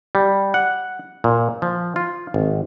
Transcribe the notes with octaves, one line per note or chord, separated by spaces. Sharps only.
G3
F#5
A#2
F3
F4
G#1